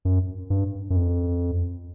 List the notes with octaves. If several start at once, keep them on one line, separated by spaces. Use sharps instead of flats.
F#2
G2
F#2
F2